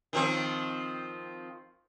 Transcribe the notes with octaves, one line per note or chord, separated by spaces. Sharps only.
D#3 F3 C4